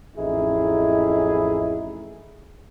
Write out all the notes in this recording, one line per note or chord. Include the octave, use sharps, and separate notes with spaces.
A1 F2 D#4 E4 G#4